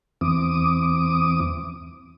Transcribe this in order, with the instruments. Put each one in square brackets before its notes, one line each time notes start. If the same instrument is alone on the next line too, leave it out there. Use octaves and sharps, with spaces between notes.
[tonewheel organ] E2 E3 C4 D6 D#6